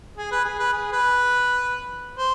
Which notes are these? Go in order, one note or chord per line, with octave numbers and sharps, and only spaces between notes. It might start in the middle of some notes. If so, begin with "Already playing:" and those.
G#4
B4
G#4
B4
G#4
B4
C5